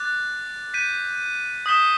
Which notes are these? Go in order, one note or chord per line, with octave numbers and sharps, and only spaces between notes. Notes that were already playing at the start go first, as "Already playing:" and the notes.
Already playing: D6 F#6 A6
G6 B6 D#7
D#6 G6 B6 E7 G7